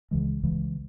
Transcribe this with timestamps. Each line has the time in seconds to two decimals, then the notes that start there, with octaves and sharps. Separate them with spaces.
0.11 C#2 C#3 E3 G#3
0.43 C#2 C#3 E3 G#3